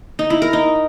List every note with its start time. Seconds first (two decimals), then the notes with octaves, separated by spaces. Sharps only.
0.19 D#4
0.30 E4
0.42 A#4
0.53 D#4